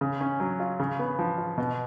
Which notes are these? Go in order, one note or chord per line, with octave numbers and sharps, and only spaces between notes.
C#3
C#4
F#3
F4
C#3
B3
F3
F4
B2